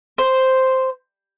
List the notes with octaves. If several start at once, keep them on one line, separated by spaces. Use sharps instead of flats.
C5